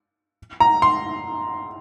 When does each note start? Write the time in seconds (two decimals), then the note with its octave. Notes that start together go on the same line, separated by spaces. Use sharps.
0.60 A#5
0.82 C6